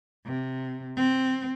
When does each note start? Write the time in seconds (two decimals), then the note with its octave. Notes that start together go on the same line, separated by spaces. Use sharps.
0.25 C3
0.96 C4